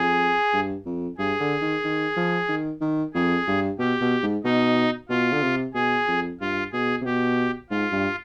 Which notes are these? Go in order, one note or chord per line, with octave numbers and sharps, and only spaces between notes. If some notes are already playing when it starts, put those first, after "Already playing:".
Already playing: F2 G#4
G2
F2
G2 G#4
D3
D#3
D#3
F3
D#3
D#3
F2 G#4
G2
B2 G4
B2
G#2
B2 D#4
B2 F4
D3
C3
B2 G#4
F2
G2 F4
B2 G#4
C3
B2 G4
G#2 F4
G2